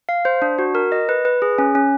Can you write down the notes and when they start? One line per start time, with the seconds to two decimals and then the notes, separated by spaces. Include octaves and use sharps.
0.09 F5
0.25 C5
0.42 D4
0.59 F#4
0.75 A#4
0.92 D#5
1.09 B4
1.25 B4
1.42 G#4
1.58 C#4
1.75 C#4